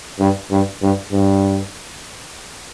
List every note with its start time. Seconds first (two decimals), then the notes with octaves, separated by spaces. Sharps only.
0.19 G2
0.51 G2
0.82 G2
1.12 G2